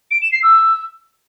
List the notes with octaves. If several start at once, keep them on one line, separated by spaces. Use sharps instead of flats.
D7
E7
C7
E6